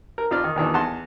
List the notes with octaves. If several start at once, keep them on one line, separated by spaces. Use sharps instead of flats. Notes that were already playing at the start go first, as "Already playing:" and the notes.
A#4
F2 F4 D5 F6
D#3
D#2 A#2 D#3 E3 D4
E2 F#5 A5 C6